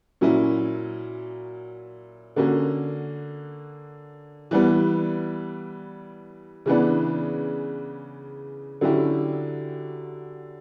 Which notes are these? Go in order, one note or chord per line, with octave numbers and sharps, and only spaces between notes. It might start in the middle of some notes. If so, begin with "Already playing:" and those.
A#2 F#3 C#4 E4
D3 A#3 C#4 F#4
E3 G3 B3
C#3 E3 B3 D4
D3 F#3 C#4 E4 G4